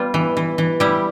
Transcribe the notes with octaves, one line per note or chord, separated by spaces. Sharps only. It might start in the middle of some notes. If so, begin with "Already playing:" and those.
Already playing: G3 B3 F4
E3
E3
E3
G3 E4 G4